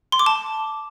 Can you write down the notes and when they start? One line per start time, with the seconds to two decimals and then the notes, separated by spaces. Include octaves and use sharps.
0.12 C6
0.19 D6
0.26 A5